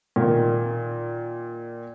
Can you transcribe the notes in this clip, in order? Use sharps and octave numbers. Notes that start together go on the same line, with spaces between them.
A#2 D#3